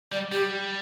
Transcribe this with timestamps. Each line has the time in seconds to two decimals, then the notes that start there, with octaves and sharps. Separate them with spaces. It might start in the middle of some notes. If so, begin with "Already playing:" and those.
0.12 G3 D5
0.32 G3 G4